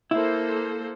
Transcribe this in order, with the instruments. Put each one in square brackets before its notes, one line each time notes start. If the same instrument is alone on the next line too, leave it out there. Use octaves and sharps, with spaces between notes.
[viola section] A#3 A4 C5 [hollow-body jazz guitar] E4